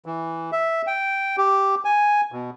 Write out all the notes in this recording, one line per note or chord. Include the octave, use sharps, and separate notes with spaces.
E3
E5
G5
G4
G#5
B2